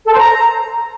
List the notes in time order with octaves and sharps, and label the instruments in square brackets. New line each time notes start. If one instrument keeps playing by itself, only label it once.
[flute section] A4
C5
A#5